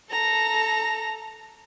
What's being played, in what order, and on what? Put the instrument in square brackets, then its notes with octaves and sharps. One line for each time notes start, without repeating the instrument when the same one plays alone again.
[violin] A4 A#5